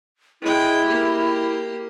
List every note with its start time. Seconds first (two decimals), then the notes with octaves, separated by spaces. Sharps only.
0.42 G#3 E4 G5
0.86 A#3 G4